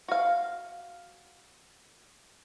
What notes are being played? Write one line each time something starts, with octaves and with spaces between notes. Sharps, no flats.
F#4 F5